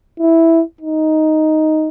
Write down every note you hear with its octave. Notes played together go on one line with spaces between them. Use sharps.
E4
D#4